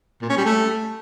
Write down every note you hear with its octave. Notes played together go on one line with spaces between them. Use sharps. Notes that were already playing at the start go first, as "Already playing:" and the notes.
A#2
C#4
G3
A3